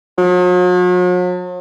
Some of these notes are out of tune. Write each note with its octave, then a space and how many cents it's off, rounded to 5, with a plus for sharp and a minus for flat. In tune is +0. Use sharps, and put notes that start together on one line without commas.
F#3 -45